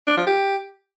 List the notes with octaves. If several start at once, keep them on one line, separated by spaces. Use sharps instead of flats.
D4
F3
G4